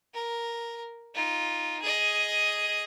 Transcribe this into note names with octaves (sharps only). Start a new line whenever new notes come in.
A#4
D#4 F4
G#4 D#5